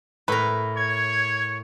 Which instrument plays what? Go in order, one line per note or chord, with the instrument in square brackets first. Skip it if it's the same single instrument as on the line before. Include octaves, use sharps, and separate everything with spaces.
[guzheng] A2 A#4 [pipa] B4
[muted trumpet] C#5 [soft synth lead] G#6